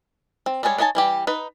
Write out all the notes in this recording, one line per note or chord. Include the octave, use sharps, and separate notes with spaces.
C4
G3 G#3 G#4 B4 C#5
D4 D#4 C#5 G#5 A5
E3 G3 G4
D#4 B4